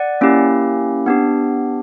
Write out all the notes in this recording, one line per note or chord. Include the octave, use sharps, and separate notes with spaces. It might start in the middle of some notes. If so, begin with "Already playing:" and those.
Already playing: D5 F#5
A#3 C#4 E4 G4
B3 D4 G4